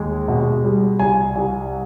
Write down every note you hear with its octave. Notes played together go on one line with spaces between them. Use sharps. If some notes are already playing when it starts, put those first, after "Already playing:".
Already playing: D#2 G#3
B2
G3
C2 G#5
C2